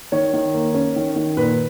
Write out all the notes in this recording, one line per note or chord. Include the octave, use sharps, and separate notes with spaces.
D#3 C#5
D#3
A#3
C#4
D#3
D#3
A#2 B4